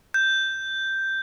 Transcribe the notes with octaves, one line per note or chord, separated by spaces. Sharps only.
G6